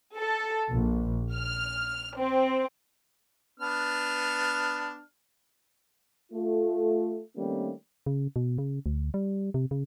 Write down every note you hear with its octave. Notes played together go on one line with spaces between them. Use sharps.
A4
A#1
F6
C4
B3 D4 F6
A3 F4
D#3 G3 A3 A#3 C4 C#4
C#3
B2
C#3
D2
G3
C3
C#3